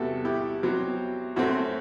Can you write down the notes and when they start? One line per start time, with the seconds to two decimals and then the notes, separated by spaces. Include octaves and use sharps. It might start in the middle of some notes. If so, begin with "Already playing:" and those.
Already playing: E2 C3 G3 B3 F#4 A4
0.25 E4 G4
0.63 B2 F#3 C4
1.36 F#2 F#3 A3 C4 F#4